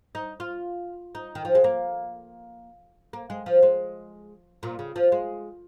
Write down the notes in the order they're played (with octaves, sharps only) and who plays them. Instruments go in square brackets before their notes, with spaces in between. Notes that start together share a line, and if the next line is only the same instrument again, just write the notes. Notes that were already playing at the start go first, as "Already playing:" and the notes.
[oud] D#4
F4
D#4
D#3
F3
G#3
A#3
A#3
G#3
F3
G#3
A#2
C#3
F3
G#3